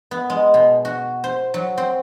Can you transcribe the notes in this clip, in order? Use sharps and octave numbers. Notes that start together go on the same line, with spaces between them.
B3
G#3
B2
F#4
C5
F#3
C4